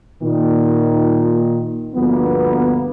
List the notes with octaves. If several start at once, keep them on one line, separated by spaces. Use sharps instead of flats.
A#2 D#3
D2 G2 F3 A#3 B3